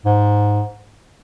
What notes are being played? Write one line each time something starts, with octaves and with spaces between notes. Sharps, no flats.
G#2